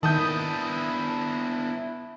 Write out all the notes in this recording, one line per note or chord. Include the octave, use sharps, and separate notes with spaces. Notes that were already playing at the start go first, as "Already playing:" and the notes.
D#3 B3 D4 E4 A5 D#6 G6